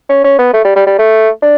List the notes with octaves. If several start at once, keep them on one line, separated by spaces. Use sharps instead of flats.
C#4
C#4
B3
A3
G3
G3
G3
A3
D4